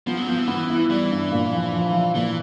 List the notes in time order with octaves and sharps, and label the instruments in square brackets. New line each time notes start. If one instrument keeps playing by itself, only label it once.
[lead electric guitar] F3 [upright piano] B3
[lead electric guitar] F#3
[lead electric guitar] F3 [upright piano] B3
[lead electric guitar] E3
[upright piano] B3
E4
[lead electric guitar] E3 [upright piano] G3
[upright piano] G2
A#2
F3
F3
F3
[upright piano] A#2 [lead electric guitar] E3